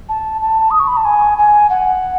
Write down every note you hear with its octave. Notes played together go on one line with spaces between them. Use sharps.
A5
A5
D#6
C#6
B5
A5
G#5
G#5
F#5